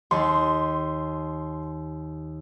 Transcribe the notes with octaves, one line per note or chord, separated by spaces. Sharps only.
D#2 C6